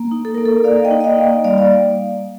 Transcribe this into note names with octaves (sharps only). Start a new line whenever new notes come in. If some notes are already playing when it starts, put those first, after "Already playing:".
Already playing: A#3
D#4
A4
A#3 A#4
A4
A#3 D5 F5
D#5 G5
D#4
D#5
D5 F5
A#3
G3 D5 F5
D5